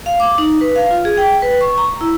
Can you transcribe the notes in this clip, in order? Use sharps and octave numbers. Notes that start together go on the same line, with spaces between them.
F5
D6
D#4
B4
F5
F4
G#4
G5
B4
C#6
A#5
E4